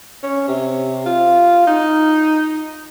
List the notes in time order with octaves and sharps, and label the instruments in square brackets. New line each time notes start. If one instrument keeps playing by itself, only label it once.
[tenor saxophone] C#4
C3
F4
D#4